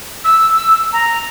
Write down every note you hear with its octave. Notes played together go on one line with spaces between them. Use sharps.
E6
A#5